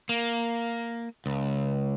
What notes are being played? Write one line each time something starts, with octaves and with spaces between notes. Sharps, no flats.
A#3
C#2